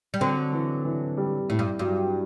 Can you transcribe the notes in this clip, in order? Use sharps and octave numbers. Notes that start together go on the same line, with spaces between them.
G3
D3 F#3 C4
E3
E3
G3
A2 E4
G2
G2 F#3